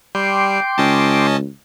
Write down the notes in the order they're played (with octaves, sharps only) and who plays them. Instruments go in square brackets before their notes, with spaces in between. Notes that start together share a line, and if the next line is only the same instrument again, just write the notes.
[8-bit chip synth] G3 [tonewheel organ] G5 C6 D6
[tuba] C#2 [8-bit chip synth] C#4 D#5 A5